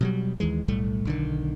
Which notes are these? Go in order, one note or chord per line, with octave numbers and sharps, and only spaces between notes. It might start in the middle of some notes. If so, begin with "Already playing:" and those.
B2 F#3 G3
D#2 D#3 E3 G#3
B1 A2 G3 A3
B1 D3 D#3